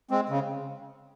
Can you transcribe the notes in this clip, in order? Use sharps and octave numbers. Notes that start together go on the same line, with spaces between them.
G#3 C4
C#3